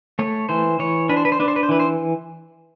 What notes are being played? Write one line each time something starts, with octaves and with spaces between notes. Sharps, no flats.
A3 C#5
E3 C5
E3 C#5
D4 B4
C5
B4
C5
D4 B4
C5
B4
C5
E3 B4
C5